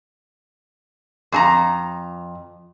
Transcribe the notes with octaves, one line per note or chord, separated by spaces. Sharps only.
F2 A5 A#5